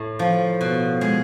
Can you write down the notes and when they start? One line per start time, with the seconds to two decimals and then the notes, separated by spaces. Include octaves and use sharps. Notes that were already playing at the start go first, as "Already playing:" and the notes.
Already playing: A2
0.19 F3
0.61 B2
1.01 G#3